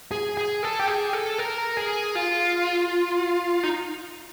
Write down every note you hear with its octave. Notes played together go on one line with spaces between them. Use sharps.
G#4
G#4
A4
G4
G#4
A4
A#4
G#4
F4
D#4